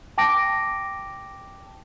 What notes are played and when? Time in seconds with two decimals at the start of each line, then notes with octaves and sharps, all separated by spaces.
0.18 G5 A5 D6 A#6 D7